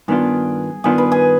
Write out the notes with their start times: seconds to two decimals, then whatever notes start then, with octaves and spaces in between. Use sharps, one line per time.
0.08 G2 D#3 B3 D4 F4 G#4
0.84 G2 D#3 B3 D4 F4 G#4
0.98 B4
1.12 G#4